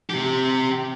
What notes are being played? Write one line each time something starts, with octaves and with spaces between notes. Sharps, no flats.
C3 G4